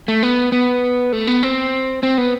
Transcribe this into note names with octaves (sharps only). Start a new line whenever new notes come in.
A3
B3
B3
A3
B3
C4
C4
B3